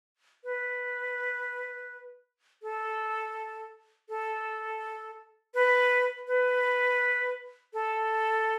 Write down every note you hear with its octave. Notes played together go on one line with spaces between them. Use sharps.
B4
A4
A4
B4
B4
A4